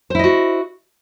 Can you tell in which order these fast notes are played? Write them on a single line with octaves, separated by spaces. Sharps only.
C5 E4 D#5 F#4